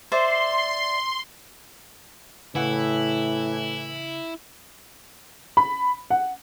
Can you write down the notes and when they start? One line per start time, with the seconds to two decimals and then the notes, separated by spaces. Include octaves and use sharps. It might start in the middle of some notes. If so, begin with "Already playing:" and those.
0.12 C5 D5 E5 C6
2.55 A2 C#3 E3 E4 B4 F#5
5.57 B5
6.10 F#5